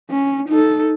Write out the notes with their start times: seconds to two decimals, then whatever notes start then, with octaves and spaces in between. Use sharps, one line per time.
0.11 C#4
0.49 D#4 A4